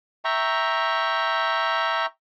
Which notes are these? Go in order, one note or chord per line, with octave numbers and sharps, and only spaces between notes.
E5 G5 A#5 C#6